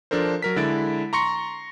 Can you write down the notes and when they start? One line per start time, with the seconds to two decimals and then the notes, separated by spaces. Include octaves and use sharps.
0.11 F3 D4 A4 A#4 C5
0.42 F#3 A#4 B6
0.56 D3 G#3 E4 A6 D7
1.13 A#5 C6 C#6 A#6 C#7